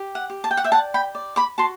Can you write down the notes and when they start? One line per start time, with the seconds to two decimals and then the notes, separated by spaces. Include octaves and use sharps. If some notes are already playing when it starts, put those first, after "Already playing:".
Already playing: G4
0.15 F#5
0.30 G4
0.44 A5
0.51 G5
0.57 F#5
0.64 E5 G5
0.72 D5 F#5 A5
0.94 G5 B5
1.15 D5
1.36 B5 D6
1.58 F#4 A5 C6